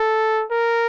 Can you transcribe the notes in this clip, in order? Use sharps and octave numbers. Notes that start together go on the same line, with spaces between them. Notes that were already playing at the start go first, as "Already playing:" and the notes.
Already playing: A4
A#4